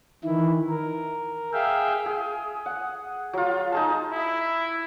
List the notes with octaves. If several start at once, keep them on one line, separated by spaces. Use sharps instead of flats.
D#3 E3 E4
A#4
G#4 E5 F5 G5
G#4
F#5
F#3 F4
D#4 G#4 A5
E4